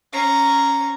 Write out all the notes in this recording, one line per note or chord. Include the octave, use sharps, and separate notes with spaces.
C#4 A#5